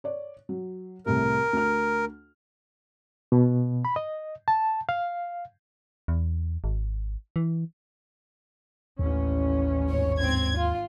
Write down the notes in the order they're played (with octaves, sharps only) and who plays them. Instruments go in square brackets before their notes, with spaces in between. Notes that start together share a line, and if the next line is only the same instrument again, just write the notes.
[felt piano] C#5 D5
F#3
[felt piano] C2 A2 C3 [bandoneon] A#4
[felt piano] D2 F6
[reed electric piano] B2
B5
D#5
A5
F5
[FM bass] E2
G#1
E3
[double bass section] A1 C#4 [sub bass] D#2
[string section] G#1 C#5
G#1 C4 G#6
F4